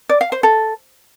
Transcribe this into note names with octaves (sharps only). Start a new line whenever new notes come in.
D5
F5
C5
A4